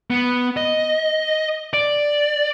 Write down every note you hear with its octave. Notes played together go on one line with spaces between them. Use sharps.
B3
D#5
D5